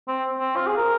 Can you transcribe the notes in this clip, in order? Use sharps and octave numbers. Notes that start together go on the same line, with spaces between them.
C4
C4
F4
G#4
A#4